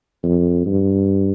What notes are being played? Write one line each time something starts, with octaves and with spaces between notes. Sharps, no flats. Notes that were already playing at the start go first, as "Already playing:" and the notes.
F2
G2